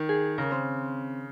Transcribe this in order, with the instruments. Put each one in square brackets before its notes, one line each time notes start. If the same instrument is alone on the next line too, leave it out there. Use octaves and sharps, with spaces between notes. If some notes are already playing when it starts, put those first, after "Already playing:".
Already playing: [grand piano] D#3
[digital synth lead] G#4
[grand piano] C#3 [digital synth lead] A#4
[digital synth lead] C4